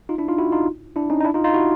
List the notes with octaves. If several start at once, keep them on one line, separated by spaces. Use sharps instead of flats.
D#4 F4
D4 E4
D#4 F4
E4 F#4
D#4 F4
D4 E4
C#4 D#4
D#4
D4 E4
D#4 F4
D#4 F4
E4 F#4